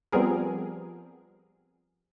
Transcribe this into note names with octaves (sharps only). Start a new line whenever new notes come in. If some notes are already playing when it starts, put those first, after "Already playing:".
F3 G3 B3 C4 G#4 A#4